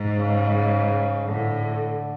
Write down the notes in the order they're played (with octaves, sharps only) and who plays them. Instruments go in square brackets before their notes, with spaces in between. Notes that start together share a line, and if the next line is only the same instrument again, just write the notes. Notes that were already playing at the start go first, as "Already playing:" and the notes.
Already playing: [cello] G#2
[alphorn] C#3
[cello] A2 [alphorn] D3